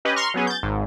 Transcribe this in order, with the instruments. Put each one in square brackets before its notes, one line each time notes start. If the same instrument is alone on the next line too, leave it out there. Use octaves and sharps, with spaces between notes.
[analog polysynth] C#4 G4 B4 D#5
A#5 C6 C#6 F6
F#3 B3 C#4 G#4
G6 A6
G#1 G#2